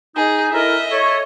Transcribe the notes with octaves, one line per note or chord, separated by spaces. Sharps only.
D#4 G#4
E4 A4 A#4 D#5 E5
A4 C#5